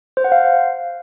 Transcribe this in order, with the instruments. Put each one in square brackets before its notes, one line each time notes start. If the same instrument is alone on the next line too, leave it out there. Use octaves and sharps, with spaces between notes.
[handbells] C5
F#5
F5